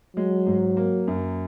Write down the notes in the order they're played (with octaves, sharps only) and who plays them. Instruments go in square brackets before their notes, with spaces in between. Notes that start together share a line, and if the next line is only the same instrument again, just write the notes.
[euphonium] F#3 [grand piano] G#3
[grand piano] G#2
A#3
F#2